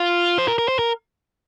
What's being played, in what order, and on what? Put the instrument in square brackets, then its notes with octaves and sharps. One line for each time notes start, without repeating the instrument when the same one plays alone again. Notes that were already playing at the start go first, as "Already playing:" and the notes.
Already playing: [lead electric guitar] F4
C5
A#4
A#4
C5
A#4